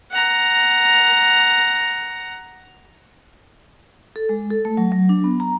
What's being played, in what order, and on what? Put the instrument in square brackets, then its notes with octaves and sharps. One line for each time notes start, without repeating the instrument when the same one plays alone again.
[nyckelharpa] F#5 A#5
[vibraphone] A4
G#3
A4
A3
F#3
F#3
D4
B3
A#5